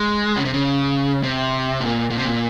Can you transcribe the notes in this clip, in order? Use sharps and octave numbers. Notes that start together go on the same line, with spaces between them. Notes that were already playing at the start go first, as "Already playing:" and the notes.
Already playing: G#3
C#3
C3
C#3
C3
A#2
A#2
C3
A#2